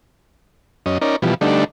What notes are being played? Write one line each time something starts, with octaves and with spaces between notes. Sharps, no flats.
F#2 C#4 D#5
C#4 D#4 A#4 D5
B2 E3 F3 G3
D3 G3 A3 D4 D#4